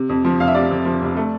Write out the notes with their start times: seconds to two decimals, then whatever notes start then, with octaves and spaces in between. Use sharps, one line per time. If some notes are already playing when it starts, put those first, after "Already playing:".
Already playing: C3
0.09 F2
0.24 F3
0.40 F1 F5
0.47 E5
0.55 C3 D5
0.71 F2
0.85 F3
1.01 F1
1.17 A3